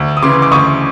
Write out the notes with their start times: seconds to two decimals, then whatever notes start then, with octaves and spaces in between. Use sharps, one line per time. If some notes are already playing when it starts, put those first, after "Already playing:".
Already playing: D2
0.17 D#6
0.22 C#3 E3 C6 D6
0.42 D6
0.51 D2 C#6 D#6